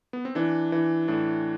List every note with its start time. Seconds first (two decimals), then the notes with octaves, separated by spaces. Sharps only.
0.13 B3
0.25 C4
0.35 E3 D4
0.72 E3
1.08 A2 D4